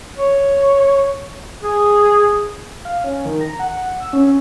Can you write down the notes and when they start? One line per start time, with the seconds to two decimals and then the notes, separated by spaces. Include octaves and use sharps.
0.17 C#5
1.62 G#4
2.85 F5
3.04 C#4
3.25 D#3
3.41 A#5
3.59 F#5
4.00 E6
4.13 C#4